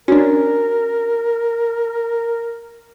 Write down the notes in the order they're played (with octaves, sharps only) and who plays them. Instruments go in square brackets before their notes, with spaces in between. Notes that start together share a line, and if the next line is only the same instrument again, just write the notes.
[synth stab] C#4 D4 [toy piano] F#4 [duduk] A#4